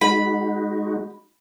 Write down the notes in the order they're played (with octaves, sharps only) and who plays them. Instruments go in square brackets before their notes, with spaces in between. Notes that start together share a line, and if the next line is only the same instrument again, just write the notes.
[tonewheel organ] G#3 D#4 F#4 [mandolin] B5